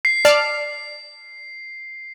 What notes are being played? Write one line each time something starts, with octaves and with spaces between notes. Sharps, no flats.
C7
D5 A5 F6